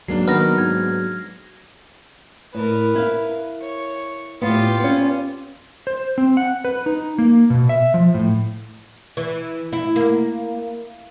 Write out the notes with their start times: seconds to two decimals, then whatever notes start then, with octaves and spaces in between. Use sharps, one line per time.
0.08 G#2 F#3 A#3 D4 C7
0.28 D#3 B3 F6 A#6
0.58 G#2 G#6
2.55 A2 A#4 B4
2.95 E4 F5
3.62 C#5
4.42 A2 B3 F4 G4
4.79 B3 C#4
5.87 C5
6.18 C4
6.37 F#5
6.65 B4
6.86 D#4
7.18 A#3
7.50 B2
7.69 E5
7.94 F3
8.14 A2
9.17 E3
9.73 E4
9.96 A#3